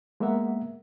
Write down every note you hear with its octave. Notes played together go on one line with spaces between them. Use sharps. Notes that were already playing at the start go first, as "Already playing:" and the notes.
G#3 A#3 B3 A#4 E5 F#5